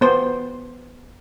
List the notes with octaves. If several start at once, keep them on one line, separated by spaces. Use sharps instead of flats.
B3 C5